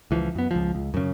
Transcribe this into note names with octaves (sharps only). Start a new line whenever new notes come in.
C#2 E3 F3
F#2 B3
C#2 F3
C#2
F#2 C#3